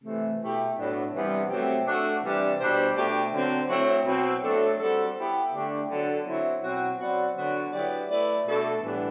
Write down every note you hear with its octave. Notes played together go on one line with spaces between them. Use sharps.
C3 E3 A3
B2 A3 E4 G4
A2 F#3 B3 D4
C3 E3 G3 B3
C3 F#3 A3 C4 G4
A3 D4 F#4 A4
C3 E3 G3 D4
B2 G3 D4 G4 C5
B2 A3 D4 G4
D3 F#3 C4
F#3 A3 C4 E4
B2 F#3 C4
F#3 A3 D4 A4
G3 C4 F#4 A4
B3 E4 G4
D3 A3 D4 G4
D3 F#3 B3 D4 A4
F#3 C4 E4
B2 F#3 C4 F#4
F#3 C4 F#4 B4 D5
D3 F#3 B3 D4 F#4
F#3 B3 E4 G4 D5
A3 E4 B4 D5
B2 A3 D4 A4
A2 E3 G3 B3 D4